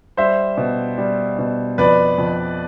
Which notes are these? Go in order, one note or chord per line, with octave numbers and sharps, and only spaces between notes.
G3 C5 E5
B2
G3
B2
F2 B4 D5
F2